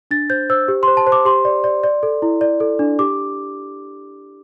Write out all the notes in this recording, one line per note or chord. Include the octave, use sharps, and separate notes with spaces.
D4 A6
C5 G6
C5 E6
G4
C5 C6
A5
C5
D6
G4 C6
D5
D5
D5
A4
E4
D5
A4
D4
G4 D6